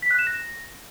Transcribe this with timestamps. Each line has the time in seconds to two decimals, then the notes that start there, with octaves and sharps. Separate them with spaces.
0.02 B6
0.11 F#6
0.19 E7
0.27 A#6